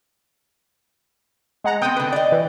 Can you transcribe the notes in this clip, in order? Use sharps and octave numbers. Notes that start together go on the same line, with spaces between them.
G#3 F#5 A#5
B3 C4 G5 D#6
D3 B4
D5 D#5
E3